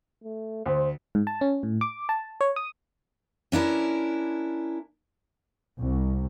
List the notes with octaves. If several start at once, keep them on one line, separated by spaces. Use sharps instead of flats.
A3
D2 C5
G#2
A5
C#4
A2
D6
A5
C#5
D#6
C#4 D4 E4 A#4
C2